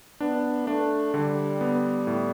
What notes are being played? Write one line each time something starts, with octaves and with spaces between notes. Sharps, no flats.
B3 D4
A3 D4
D3 G3
B3
A2